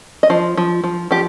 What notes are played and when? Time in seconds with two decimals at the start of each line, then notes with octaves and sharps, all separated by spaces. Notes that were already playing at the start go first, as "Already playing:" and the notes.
0.23 D#5
0.30 F3 C5
0.57 F3
0.84 F3
1.11 F3 G4